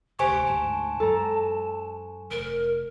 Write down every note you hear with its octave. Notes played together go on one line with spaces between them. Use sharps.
F1 D2 G4 C5 G#5 C#6
D2 G#2 A5
F#2 G#3 A4 A#5
F1 A#4